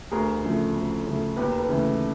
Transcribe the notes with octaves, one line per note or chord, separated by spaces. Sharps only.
D2 G#4 A#4
C#3 F3 A3
D2
C#3 F3 A3
D#2 B4
A#4
A4 B4
C#3 E3 A3